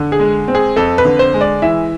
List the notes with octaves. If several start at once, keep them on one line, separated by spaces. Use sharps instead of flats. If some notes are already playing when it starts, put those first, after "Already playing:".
Already playing: D3
G#4
G#3
C4
G#4
F2 A4
B4
D3
C5
G#3
D5
E3 E5